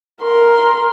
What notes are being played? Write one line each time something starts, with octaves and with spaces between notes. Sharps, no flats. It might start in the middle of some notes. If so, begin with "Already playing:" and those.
A#4 C6